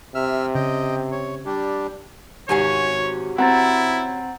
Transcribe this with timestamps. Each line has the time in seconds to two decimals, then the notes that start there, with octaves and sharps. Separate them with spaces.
0.15 C3 E5 E6 F6
0.55 C#3 D#5 G5
1.12 C#5
1.46 G3 D4 G4
2.49 G#1 C3 C#4 F#4 C#5 G#5 C7
3.38 C4 E4 F#5 A#5 A6